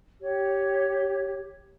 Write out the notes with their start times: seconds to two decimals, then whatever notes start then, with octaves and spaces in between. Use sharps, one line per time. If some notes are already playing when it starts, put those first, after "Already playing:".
0.20 G4 C#5